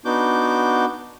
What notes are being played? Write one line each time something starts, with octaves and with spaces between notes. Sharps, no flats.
B3 D4 D#4 F#4 D6 G6